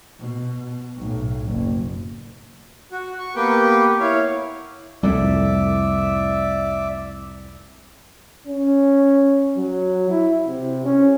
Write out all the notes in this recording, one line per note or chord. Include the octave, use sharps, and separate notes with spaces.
B2
B1 A2
F#1
F#4
C#6
A#3 B3 G4 B4 G5
E4 C#5 F5
C2 F2 A2 D5 E5
C#4
F#3
E4
C3
C#4